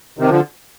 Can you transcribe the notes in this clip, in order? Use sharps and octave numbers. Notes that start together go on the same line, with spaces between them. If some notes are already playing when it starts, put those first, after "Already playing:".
C3 D#3
D3 F3